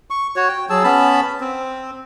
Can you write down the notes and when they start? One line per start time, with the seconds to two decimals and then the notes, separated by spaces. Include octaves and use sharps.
0.10 C#6
0.36 F#4 C#5
0.48 G5
0.70 F#3 G#4 A5 E6
0.84 B3 C#4 A5 B5
1.40 C4